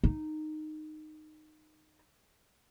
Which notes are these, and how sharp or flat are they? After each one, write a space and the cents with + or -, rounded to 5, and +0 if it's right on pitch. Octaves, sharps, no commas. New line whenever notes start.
D#4 -15